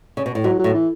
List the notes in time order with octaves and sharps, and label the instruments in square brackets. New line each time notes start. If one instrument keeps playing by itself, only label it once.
[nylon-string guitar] C#3
B2
A2
[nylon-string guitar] G#2 [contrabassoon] F#3
[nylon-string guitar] A2 [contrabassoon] F#3
[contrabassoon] E3